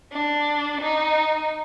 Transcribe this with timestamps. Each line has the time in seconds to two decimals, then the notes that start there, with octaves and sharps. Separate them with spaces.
0.12 D4
0.81 D#4